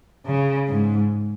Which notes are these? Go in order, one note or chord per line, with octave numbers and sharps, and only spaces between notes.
C#3
G#2